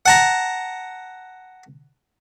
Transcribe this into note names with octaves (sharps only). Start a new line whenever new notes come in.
F#5 A5 A#5